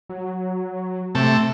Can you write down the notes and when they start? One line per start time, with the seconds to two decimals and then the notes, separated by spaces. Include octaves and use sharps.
0.09 F#3
1.15 C3 A3 A4